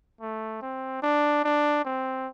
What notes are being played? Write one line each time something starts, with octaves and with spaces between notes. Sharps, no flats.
A3
C4
D4
D4
C4